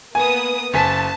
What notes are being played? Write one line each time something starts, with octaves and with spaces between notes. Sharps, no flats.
A#3 B3 G#5 D#6
F#1 G#5 A5 B6